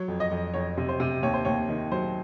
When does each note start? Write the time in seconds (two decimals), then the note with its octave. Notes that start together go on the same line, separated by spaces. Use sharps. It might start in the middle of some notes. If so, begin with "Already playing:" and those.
Already playing: F#3 C#5
0.08 F2
0.20 D#5
0.31 F2
0.54 F2 C#5
0.77 C3
0.89 C5
1.00 C3
1.22 D#2 C#5
1.34 C5
1.45 D#2 C#5
1.69 D#3
1.92 F#3 C5